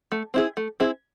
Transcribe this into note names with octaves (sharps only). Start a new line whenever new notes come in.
A3
C4 E4 G#4
A3
C4 E4 G#4